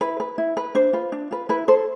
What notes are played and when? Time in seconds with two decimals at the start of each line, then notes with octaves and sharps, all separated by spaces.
0.01 E4 B4
0.20 B4
0.38 E4
0.57 B4
0.75 D4 C5
0.93 F4 B4
1.12 D4
1.31 F4 B4
1.49 E4 B4
1.68 A4 C5